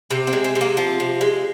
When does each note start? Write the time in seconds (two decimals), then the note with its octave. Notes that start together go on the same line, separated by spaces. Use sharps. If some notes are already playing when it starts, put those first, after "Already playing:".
0.11 C3 C4
0.27 C4
0.33 G#3
0.44 C4
0.55 C3
0.61 A#3
0.77 F3 C4
1.00 C3
1.21 G#3